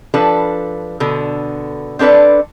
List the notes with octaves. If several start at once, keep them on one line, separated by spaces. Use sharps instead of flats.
F3 D4 A4 B4
B2 D3 A4
C4 D4 A4 B4 D5